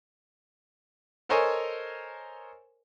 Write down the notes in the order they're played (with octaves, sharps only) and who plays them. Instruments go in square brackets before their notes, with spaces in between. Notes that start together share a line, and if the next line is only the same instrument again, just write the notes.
[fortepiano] A4 A#4 C5 C#5 D#5 G#5